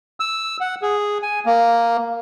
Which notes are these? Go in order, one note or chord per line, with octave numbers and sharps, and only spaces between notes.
E6
F#5
G#4
G#5
A#3